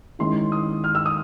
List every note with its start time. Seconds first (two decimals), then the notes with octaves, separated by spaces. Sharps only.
0.19 D#3 G#3 C#4 E4 C6
0.52 D#6
0.84 F6
0.95 E6
1.06 D#6